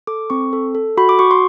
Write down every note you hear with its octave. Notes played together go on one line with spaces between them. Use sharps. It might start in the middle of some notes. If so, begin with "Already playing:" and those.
A4 D6
C4 C#6
A4
A4
F#4 B5
D6
F#4 C#6
C6